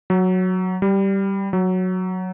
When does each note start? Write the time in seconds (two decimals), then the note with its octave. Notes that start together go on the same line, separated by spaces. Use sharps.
0.10 F#3
0.82 G3
1.53 F#3